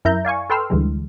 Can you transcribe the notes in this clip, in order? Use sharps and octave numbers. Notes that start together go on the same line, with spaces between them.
F#2 E4 A#4 E5 A#5 G6
D5 F5 G#5 C#6
A4 B4 G5 C6 E6 F6
D2 D3 E3 G3 G#3